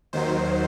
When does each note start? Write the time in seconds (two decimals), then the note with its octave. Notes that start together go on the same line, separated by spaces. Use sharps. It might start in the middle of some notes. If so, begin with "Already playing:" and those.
0.13 D#2 D#3 F#3 C5